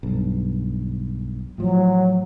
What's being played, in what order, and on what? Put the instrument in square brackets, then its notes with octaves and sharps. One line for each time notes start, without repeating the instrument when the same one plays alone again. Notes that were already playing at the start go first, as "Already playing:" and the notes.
[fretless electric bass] B1 G2
[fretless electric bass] A2 F3 [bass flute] F#3